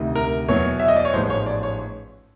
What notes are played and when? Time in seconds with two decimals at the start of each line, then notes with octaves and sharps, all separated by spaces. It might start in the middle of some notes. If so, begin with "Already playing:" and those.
Already playing: D2 C3 D#3
0.15 A#4
0.48 E2 B2 F#3 B3 C#5
0.80 E5
0.88 D#5
0.96 D5
1.05 C#5
1.13 A1 G#2 F3 G#3 B3 C5
1.30 C#5
1.46 D5
1.63 C#5